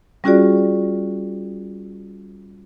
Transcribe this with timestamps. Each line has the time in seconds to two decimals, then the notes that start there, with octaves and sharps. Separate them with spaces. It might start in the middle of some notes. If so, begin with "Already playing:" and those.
0.24 G3 C#4 F4 F#4 G#4 D5